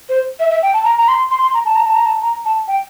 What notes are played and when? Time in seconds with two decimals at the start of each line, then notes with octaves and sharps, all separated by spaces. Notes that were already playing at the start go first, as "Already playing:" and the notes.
0.09 C5
0.40 E5
0.51 E5
0.62 G5
0.73 A5
0.84 A#5
0.98 A#5
1.08 C6
1.31 C6
1.42 C6
1.54 A#5
1.65 A5
1.76 A#5
1.85 A5
1.95 A#5
2.05 A5
2.22 A#5
2.45 A5
2.68 G5